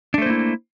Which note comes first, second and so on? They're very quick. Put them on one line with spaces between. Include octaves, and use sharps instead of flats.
D4 A3 C5 A#3 E4